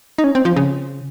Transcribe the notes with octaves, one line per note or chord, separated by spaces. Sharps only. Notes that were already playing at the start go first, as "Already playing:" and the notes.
D#4
C#4
C4
F3
C#3